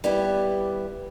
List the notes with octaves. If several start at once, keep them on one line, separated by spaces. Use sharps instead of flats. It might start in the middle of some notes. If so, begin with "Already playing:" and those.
G3 B3 E4 G4